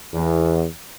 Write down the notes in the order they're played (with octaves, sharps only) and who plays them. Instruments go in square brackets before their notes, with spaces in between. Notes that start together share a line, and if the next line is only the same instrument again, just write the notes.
[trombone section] E2